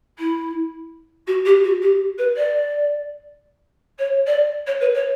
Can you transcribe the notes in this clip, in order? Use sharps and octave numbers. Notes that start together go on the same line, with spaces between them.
E4
F#4
G4
F#4
G4
B4
D5
C#5
D5
C#5
B4
C#5